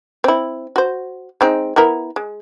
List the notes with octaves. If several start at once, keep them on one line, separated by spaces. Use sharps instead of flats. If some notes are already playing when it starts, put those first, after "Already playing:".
C4 E4
F#4 C5
G#3 C4 D#4
B3 E4 A#4
G#3